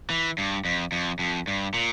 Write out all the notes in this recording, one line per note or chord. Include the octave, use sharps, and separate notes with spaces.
E3
G2
F2
F2
F2
G2
A#2